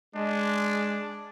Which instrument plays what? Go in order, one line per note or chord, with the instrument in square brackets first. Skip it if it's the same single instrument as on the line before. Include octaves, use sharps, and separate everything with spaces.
[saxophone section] G#3 [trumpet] D4